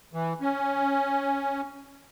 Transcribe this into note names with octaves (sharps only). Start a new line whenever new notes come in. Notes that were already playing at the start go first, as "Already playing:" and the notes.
E3
C#4